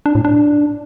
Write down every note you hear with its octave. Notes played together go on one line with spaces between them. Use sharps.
D4
A2
D4